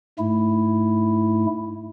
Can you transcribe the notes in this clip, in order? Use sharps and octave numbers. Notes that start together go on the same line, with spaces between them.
G#2 A3 E4